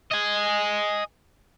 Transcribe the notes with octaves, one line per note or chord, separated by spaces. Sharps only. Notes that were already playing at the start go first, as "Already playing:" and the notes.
D#5 G#5